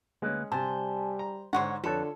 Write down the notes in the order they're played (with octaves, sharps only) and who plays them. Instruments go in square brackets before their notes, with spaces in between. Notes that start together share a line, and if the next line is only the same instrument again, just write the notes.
[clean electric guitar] D2 A#3 B4 [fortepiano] G#3 C#4
[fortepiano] C3 [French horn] G3 [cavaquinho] C5 [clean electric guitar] G#5 A5
[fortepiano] A#5
[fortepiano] G#2 D3 [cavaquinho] C5 C#5 F#5
[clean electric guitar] F2 B4 A5 [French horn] D3 [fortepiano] F4 C#5 [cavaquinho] A4